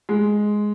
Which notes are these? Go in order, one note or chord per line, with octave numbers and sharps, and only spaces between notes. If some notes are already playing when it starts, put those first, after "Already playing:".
G#3